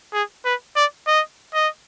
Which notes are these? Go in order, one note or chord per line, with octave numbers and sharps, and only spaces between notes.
G#4
B4
D5
D#5
D#5